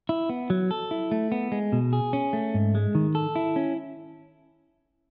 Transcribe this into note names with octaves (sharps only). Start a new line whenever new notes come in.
E4
B3
F#3
A4
E4
A3
B3
G#3
B2
G#4
C#4
A3
G#2
G#3
D#3
A4
E4
C#4